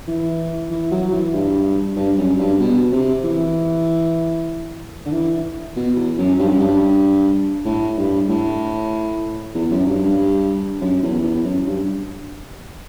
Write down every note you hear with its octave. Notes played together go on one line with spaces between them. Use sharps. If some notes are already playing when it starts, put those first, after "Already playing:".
E3
E3
F#3
E3
G2
G2
F#2
G2
B2
C3
E3
D3
E3
B2
E2
F#2
G2
F#2
G2
A2
G2
A2
E2
F#2
G2
G2
F#2
E2
E2
F#2
G2